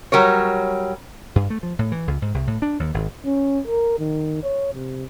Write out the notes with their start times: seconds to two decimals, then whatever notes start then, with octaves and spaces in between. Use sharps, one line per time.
0.12 F#3 G3 A#4 C#5
1.36 G2
1.50 A3
1.63 F3
1.79 A2
1.92 E3
2.07 C#2
2.22 G#2
2.34 C2
2.47 A2
2.62 D4
2.80 D#2
2.94 G#1
3.25 C#4
3.67 A#4
3.98 D#3
4.43 C#5
4.74 C3